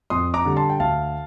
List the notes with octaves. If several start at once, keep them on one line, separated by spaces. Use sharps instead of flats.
F2 C6 D#6
A#5 D6
D3 G3
A5 C6
G5
D2 F5 A5